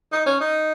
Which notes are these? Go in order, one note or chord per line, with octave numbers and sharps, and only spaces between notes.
D#4
C#4
D#4